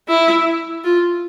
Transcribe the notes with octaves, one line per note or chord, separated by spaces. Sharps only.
E4
F4